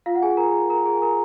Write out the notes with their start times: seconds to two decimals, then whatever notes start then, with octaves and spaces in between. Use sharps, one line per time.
0.06 F4 F5
0.15 F#5
0.22 G#4 G#5
0.37 A#4 A#5
0.70 A#4 A#5
0.85 G#4 G#5
1.02 A#4 A#5